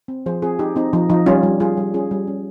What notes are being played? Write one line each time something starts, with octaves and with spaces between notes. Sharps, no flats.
C4
F3 G#4 C5
C4 F4 G#4
C4 D#4 G4
C4 D#4
F3 D#4
F3 D#4
G3 C#4 F4
G3
G3 F4 G#4
G3
C#4 F4 G#4
G3
C#4